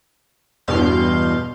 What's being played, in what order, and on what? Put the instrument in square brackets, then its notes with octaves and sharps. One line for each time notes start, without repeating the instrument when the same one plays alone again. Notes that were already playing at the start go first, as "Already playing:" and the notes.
[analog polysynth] E2 G2 B2 F5 C6 G6